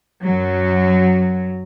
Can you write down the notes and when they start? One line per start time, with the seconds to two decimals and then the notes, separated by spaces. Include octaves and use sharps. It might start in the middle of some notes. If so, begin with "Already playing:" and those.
0.23 F#2 F#3